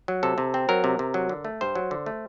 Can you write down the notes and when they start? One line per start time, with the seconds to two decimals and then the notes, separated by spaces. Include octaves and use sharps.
0.08 F#3
0.23 C3 A4
0.38 C3
0.54 C4
0.69 F#3 A#4
0.84 C3
0.99 C3
1.14 F#3
1.29 D3
1.45 A3
1.61 G2 C5
1.75 F#3
1.91 D3
2.06 A3